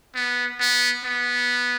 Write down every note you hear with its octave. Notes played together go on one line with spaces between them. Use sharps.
B3
B3
B3